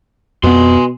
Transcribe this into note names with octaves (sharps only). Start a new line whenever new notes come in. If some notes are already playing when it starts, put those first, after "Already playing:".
F2 B2 B3 G#5 C6